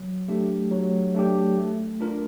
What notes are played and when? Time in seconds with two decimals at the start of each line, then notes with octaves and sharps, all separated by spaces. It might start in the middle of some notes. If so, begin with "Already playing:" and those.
Already playing: F#3
0.28 A3 D4 G4
0.71 F#3
1.14 A3 D4 G4
1.58 A3
2.01 D4 F4 A#4